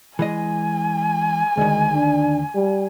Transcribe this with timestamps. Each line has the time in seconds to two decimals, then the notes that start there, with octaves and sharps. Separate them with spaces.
0.19 E3 G#3 D#5 G#5
1.57 D2 D#3 G#3
1.94 D4
2.55 G3